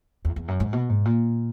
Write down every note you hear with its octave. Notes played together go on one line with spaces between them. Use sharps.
E2
E2
F#2
G#2
B2
G#2
A#2